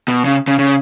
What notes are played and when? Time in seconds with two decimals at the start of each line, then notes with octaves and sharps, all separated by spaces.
0.08 B2
0.25 C#3
0.47 C#3
0.59 C#3